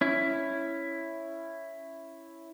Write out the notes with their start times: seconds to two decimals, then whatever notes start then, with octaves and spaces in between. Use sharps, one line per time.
0.01 C#4 E4